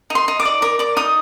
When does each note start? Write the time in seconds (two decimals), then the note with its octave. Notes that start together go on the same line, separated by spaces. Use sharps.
0.10 D#4 C6
0.28 D#4
0.40 D6
0.45 D5
0.62 A#4 D6
0.79 D5 D6
0.96 D#4 D#6